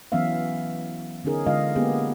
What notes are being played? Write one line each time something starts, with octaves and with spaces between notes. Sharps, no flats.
E3 F#3 B3 C#4 E5 F5
D3 B3 C#4 D#4 G#4 A#4
D3 G#3 D4 F4 D#5 F5
G#3 A#3 B3 C#4 G4 G#4